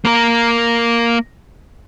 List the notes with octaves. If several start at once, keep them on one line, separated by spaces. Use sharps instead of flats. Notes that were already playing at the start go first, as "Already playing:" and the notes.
A#3 A#4